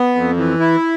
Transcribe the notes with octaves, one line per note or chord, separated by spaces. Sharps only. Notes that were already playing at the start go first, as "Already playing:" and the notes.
Already playing: B3
F2
E3
E4